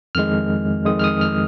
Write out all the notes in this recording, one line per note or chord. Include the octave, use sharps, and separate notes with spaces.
F2 D#3 G#3 F6
F2 D#3 G#3 D#6
F6
D#6
F6